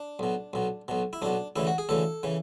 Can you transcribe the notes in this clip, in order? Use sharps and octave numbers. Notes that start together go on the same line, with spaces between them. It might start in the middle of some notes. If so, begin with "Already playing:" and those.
Already playing: D4
B1 B2
B1 B2
B1 B2
E4
B1 B2 D4
D2 C#3 E3 E4
F#4
G#4
D2 C#3 E3 A4
C#3 E3